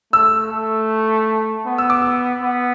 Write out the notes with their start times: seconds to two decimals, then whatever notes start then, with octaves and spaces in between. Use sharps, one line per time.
0.13 A3 E6
0.52 A3
1.66 B3
1.78 E6
1.90 D6
2.02 E6
2.42 B3